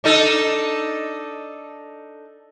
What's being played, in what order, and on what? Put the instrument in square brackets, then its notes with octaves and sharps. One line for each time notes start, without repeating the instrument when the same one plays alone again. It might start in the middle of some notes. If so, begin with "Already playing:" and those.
[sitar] D4 D#4 A4